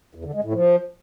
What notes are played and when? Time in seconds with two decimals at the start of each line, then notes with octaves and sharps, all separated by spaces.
0.15 E2
0.24 D3
0.34 G#3
0.44 A2
0.53 F3